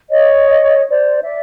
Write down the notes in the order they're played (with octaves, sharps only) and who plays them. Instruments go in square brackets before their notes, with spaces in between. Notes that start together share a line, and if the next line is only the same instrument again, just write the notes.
[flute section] C#5 D#5
C5 D5
D5 E5